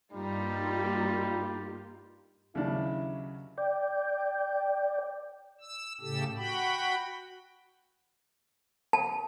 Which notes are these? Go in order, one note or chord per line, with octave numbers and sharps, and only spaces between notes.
G2 G3 A#3 D#4 F4 G4
D#2 C#3 F#3 C#4 D4 E4
D5 G5
E6
A2 C#3 G4 A4 E6
F#4 G5 B5
A5